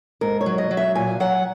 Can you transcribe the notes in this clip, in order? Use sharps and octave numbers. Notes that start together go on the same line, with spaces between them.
G#2 A#4
C#5
F#3
D#5
F#3
E5
A#2 G#5
F#3 F#5